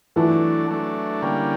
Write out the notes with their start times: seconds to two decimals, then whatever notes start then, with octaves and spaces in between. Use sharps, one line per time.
0.16 E3 F#3 A3 D4
0.69 F#3 A3 D4
1.22 D3 G3 A#3 C#4